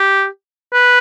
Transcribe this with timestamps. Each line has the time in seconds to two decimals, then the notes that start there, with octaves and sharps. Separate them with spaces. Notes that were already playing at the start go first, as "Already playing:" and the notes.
Already playing: G4
0.73 B4